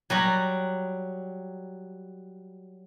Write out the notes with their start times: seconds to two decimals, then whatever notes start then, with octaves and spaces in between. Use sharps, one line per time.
0.10 F#3 G3 F#4